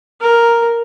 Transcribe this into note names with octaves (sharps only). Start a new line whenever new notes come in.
A#4